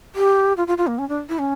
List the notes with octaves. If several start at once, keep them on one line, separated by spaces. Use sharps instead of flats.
G4
F4
F4
F4
A#3
C#4
D4
E4
C#4